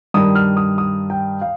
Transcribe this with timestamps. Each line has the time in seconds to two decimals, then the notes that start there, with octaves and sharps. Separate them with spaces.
0.14 G2 D#3 G3 D#6
0.35 F6
0.57 D#6
0.78 D#6
1.10 G5
1.42 F5